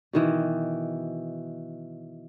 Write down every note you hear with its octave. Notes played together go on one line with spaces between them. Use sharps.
B2 D#3 E3